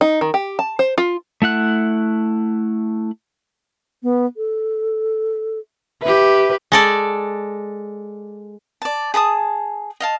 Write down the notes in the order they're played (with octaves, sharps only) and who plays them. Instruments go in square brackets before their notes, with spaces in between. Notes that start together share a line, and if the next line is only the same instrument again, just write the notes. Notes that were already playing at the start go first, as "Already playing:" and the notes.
[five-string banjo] D#4
D#3
G4
A5
C5
F4
[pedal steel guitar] A3 E4 F#5 F#6
[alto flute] B3
A4
[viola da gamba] G4 B4 [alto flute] E5
[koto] G#3 A4 D5
[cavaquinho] D5 A5
G#4 A5 A#5 D#6
D#5 F5 A5